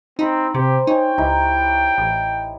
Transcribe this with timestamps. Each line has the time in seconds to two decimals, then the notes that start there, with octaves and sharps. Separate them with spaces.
0.19 C4 D#4 A#5 B5
0.54 C3 G4 C5
0.87 D#4 C#5 G5 G#5
1.18 C#2 D#4 E4 G4
1.98 A1